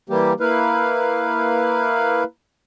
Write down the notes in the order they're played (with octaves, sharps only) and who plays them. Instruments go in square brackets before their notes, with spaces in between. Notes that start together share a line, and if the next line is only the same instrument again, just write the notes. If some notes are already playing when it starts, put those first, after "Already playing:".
[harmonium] E3 G3 A#3 G4
A#3 E4 B4 F5